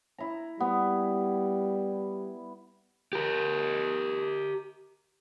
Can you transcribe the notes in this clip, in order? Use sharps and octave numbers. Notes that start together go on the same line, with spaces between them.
E4 A#5
G3 B3
G4 A#4